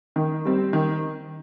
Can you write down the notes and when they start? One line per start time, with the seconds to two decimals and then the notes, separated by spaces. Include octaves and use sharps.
0.16 D#3
0.45 G3 C4
0.73 D#3